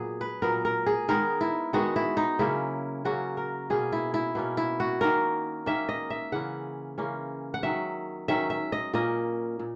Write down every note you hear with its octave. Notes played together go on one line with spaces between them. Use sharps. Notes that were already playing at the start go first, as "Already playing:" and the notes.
Already playing: A#2 F#3 B3 G#4
B4
A#2 F#3 B3 A#4
A#4
G#4
D#3 G#3 B3 A#4
E4
D#3 G#3 B3 F#4
E4
D#4
C#3 F#3 A#3 C#4 E4
C#3 F#3 A#3 C#4 F#4
A#4
B2 A#3 C#4 G#4
E4
E4
B2 A#3 C#4
E4
F#4
D#3 A#3 C#4 A#4
D#3 A#3 C#4 E5
D#5
E5
C#3 E3 A#3 C#4 F#5
C#3 E3 A#3 C#4
F#5
D#3 F#3 C#4 E5
D#3 F#3 C#4 E5
E5
D#5
A#2 A#3 C#4 D#5
A#2